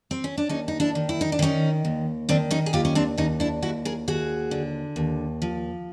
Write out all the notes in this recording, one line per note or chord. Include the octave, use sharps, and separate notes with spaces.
C4
C#4
D4
D#2 C#4 D#4
D#4
D4 E4
D#3
E4
D#4
D4
D#3 C#4 D#4
D#2
D#3 C4 D4
C#4 D#4
G#4
D#2 F4 G4
C#4
C4 D4
D#2 C#4 D#4
D4 E4
D#2 E4 F#4
G#4 A#4
D#2 F#4 G#4
D3
D#2
F3